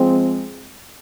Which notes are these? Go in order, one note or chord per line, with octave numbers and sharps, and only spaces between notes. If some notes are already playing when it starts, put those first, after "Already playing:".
Already playing: F3 G#3 C4